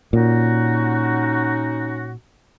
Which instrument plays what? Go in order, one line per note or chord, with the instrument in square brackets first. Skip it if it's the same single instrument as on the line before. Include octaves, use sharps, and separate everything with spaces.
[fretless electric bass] A#2 [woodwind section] C#4 D#4 F#4